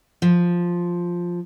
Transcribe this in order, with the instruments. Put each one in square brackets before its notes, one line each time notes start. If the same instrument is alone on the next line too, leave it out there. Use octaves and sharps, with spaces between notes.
[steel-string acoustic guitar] F3